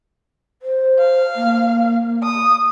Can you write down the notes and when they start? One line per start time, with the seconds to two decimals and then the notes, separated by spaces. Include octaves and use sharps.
0.62 C5
0.99 F5
1.36 A#3
2.23 D#6